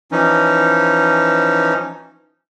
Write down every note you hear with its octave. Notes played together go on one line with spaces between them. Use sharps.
E3 F3 C#4 D#4